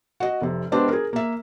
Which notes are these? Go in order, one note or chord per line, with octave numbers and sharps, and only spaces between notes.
F#4 D#5
F1 C3
G#3 B3 C4 D4 G4
G#4 A#4
A#3 E5